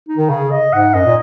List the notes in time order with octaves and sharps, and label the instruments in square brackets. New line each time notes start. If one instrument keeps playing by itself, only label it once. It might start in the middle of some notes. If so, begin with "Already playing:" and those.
[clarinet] D#4
[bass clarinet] D#3
[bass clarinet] C#3 [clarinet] G#4
[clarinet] D#5
[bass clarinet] G#2 [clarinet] F#5
[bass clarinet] F#2 [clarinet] D#5
[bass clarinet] A#2